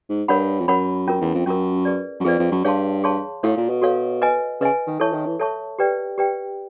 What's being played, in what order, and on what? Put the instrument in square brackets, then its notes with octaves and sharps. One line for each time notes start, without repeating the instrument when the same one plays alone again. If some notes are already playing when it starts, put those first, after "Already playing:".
[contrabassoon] G#2
[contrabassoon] G2 [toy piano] A#4 C#5 F#5 B5
[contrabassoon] F2
[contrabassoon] F#2 [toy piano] A#4 C#5 F#5 B5
[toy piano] C#4 F4 A#4
[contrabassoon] E2
F2
[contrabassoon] F#2 [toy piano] C#4 F4 A#4
[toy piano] G#4 B4 D5
[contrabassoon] F#2
[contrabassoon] F2 [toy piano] G#4 B4 D5
[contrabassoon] F2
F#2
[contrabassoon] G2 [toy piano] G#4 C#5 F5 A5 C6
[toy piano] G#4 C#5 F5 A5 C6
[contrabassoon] A2 [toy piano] F#4 A4 C#5 F5
[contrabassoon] A#2
B2
[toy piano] F#4 A4 C#5 F5
B4 D#5 G#5
[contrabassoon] C#3 [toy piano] B4 D#5 G#5
[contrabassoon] D#3
[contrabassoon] E3 [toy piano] A4 C#5 E5 A5 C#6
[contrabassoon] D#3
E3
[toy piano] A4 C#5 E5 A5 C#6
G4 B4 D5 G5
G4 B4 D5 G5